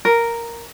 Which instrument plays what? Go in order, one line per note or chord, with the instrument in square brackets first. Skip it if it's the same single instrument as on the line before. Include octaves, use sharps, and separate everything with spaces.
[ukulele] A#4